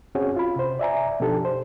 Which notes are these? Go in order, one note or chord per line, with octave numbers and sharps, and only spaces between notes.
C4 C#4 F#4 G#4 C#5
F4 B5
C3 C5
D5 E5 G#5 A#5
B2 F3 D4 D#4 G4 A4
C5